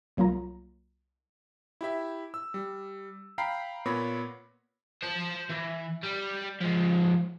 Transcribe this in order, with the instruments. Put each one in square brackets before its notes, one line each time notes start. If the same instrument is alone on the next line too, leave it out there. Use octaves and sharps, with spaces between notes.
[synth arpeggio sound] C2 F#3 A#3 F4 A#5
[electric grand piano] E4 G4 E5
E6
G3
F5 G5 A#5 B5 B6 C7
A#2 B3 C#5 B5 A#6
[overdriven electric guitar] C5 A5
E3
G3
F3 G#3